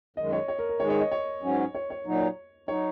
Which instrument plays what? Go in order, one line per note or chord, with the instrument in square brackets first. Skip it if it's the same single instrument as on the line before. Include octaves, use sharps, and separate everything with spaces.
[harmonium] F#2 D#3 G#3 [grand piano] D#5
[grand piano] C#5
C#5
A#4
A#4
[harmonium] G#2 D#3 G#3 [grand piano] C#5
[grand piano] C#5
D#5
C#5
[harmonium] G#2 F#3 C#4
[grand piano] C#5
C#5
[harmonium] A#2 F#3 D#4
[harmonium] F#3 D#4 [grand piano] C#5